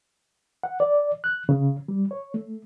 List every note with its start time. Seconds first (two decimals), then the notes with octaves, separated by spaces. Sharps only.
0.63 F#5
0.80 D5
1.24 F#6
1.49 C#3
1.88 G3
2.11 C#5
2.34 A3